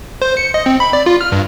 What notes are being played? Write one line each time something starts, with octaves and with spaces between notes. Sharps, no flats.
C5
C#7
D#5
C4
B5
D5
F4
F6
G2